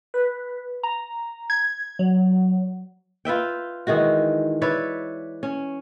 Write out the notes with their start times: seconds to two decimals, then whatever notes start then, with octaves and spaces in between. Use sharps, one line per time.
0.14 B4
0.83 A#5
1.50 G#6
1.99 F#3
3.25 F4 B4 E5 G5
3.87 D#3 E3 G#3 F#4
4.62 B4 C#5 D5 E5
5.43 C#4